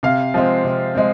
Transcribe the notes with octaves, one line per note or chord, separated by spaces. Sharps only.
C3 F5
F3 G#3 C4
C3
G#3 C4